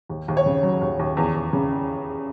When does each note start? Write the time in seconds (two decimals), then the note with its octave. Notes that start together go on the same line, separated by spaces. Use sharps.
0.09 D#2
0.28 D#2
0.37 C#5
0.46 C#3
0.63 F#3
0.81 D#2
0.99 D#2
1.17 E2
1.35 E2
1.53 C#3